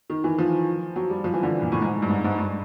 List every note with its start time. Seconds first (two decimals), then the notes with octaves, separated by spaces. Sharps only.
0.10 D#3
0.24 E3
0.39 F3
0.96 F#3
1.10 G3
1.24 F3
1.33 E3
1.43 D3
1.62 A#2
1.72 A2
1.81 G#2
2.02 G2
2.09 G#2
2.24 G#2
2.38 G2